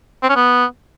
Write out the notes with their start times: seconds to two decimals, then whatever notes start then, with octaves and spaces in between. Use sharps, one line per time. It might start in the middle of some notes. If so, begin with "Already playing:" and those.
0.23 C4
0.29 C#4
0.36 B3